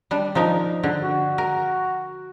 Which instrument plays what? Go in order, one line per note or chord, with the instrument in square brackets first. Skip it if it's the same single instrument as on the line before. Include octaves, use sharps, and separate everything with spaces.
[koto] G3 D4
F3 D#4 A#4
D3
[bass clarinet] F#4
[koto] A#4